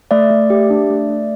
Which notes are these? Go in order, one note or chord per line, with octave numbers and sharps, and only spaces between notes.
A3 D5 E5
A3
G4
D4
A3
A3